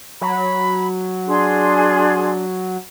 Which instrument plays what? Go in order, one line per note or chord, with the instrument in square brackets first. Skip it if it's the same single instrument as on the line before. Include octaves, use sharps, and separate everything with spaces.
[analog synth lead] F#3 [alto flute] B5
[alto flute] D4 [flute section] G#4 C6